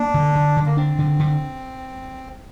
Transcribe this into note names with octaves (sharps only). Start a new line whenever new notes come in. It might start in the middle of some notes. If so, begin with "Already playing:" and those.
Already playing: A#3 D4
D3
D3
D3
A#3
C4 D4
D3
D3